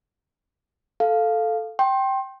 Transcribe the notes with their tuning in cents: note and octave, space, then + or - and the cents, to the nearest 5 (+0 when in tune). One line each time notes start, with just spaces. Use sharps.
A4 +0 F5 +0
G5 -10 C6 +30